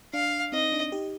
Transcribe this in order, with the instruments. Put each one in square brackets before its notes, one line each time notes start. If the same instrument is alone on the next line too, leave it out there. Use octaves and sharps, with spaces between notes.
[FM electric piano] D4 [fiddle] F5
[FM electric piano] C4 D#4 [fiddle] D#5
[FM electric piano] D4
D#4 G4